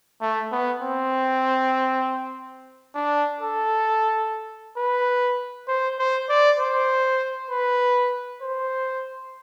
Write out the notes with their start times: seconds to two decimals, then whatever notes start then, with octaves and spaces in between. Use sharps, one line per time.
0.22 A3
0.52 B3
0.82 C4
2.95 D4
3.41 A4
4.78 B4
5.68 C5
5.99 C5
6.29 D5
6.59 C5
7.51 B4
8.42 C5